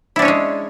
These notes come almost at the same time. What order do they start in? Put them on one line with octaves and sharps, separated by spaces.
E4 D4 C#4 C#5 G#3